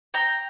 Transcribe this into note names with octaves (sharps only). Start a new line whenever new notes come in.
G5 A#5